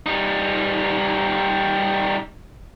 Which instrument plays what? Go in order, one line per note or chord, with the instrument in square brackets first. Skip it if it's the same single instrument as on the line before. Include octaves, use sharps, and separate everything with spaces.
[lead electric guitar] G3 D#4